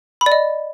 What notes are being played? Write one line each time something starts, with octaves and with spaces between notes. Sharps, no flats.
B5
D5
D#5